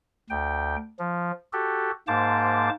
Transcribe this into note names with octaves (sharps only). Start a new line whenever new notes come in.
D2 G5
F3
F#4 G4 A4
G#2 A#3 C5 A5 D6